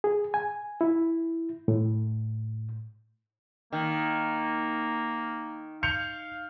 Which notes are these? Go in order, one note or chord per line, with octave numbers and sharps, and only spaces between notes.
G#4
G#5
E4
A2
D#3 A#3
F5 G6 C#7 F7